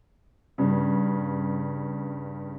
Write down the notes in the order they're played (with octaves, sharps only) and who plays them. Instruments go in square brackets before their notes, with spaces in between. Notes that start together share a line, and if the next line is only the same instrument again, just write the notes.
[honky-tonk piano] G2 C#3